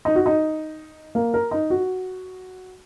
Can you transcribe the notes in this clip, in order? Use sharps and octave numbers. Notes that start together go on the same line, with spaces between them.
D#4
F#4
D#4
A#3
A#4
D#4
F#4